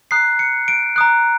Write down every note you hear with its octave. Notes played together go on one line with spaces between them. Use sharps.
A#5 D#6 F#6 C7
C#7
D7
A#5 D#6 F#6